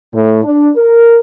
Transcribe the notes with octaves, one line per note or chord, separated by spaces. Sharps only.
A2
D4
A#4